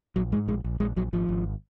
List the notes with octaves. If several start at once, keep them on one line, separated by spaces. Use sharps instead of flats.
A#1 F#3
G#2 G#3
A#1 G#3
A#1
A#1 G#3
A#1 F#3
G#1 F3
G#1